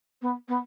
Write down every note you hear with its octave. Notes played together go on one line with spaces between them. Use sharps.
B3
B3